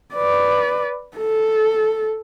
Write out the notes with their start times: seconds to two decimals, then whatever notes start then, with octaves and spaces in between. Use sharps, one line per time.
0.14 B4 D5
1.17 A4